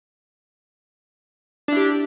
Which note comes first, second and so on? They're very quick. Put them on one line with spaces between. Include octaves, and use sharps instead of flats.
D4 E4 G4